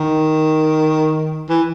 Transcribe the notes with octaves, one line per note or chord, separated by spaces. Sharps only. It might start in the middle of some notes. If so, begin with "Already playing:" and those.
Already playing: D#3
E3